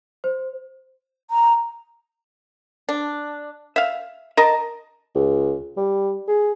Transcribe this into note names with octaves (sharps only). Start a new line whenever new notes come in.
C5
A#5
D4
E5 F5
A#4 D#5 A5
C#2
G3
G#4